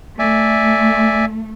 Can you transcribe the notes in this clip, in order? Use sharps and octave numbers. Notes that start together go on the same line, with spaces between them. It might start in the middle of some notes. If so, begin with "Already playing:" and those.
A3 D5 E5 G#5